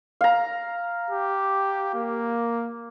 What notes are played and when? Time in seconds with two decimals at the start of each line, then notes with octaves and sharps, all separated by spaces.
0.21 F5 A#5
1.10 G4
1.94 A#3